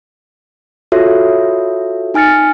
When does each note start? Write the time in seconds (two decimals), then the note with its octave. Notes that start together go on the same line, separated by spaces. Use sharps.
0.92 F4 F#4 A4 C#5 E5
2.14 D#4 G#5 F6 A6 C#7